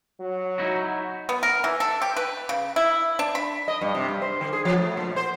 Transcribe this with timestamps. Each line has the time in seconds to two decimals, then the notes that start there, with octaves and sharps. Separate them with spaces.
0.20 F#3
0.58 D#4 E4 F#4
1.29 B3
1.43 A#4
1.64 E3
1.80 A4
2.02 G4
2.17 B4
2.49 C#3
2.76 E4
3.19 D4
3.35 B5
3.68 D#5
3.81 G2
3.95 C3
4.09 G2
4.22 C5
4.41 D3
4.53 G#4
4.65 F3
4.78 A3
4.97 A#2
5.16 C5